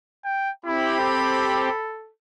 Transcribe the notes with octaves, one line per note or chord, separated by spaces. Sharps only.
G5
C4 E4 G4 B5
A4